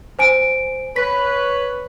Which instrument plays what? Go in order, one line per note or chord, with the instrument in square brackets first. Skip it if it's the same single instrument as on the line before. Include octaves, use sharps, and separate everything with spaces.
[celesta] C5 G#5 D7
[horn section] B4 C#5 [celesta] B6